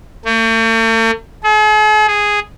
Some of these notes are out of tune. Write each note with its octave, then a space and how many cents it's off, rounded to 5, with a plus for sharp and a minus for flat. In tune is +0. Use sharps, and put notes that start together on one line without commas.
A3 +45
G#4 +45
G#4 -5